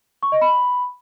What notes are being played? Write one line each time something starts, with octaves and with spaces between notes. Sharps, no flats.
C#6
D#5
B5